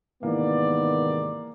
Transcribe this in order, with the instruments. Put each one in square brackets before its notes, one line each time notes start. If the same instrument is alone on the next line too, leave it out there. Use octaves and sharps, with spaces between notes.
[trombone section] G#2 C3 D#3 [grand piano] E3 A#3 [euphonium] B3 [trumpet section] D5